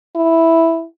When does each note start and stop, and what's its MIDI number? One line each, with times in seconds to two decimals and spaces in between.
0.16 0.85 64